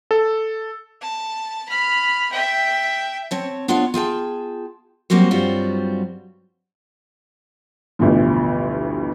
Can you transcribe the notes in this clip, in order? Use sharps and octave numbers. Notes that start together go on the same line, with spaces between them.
A4
A5
B5 F6
E5 G5
C4 C#5 A5
B3 D4 F4 A4 C#5 F5
F4 G#4 G5 A5
F#3 G3 A#3 C4 F#4 C5
G2 F#3 G3 C4 F4 F#4
A1 D2 G2 B2 F3